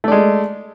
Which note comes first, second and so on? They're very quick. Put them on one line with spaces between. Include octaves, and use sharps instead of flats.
A3 D5 G#3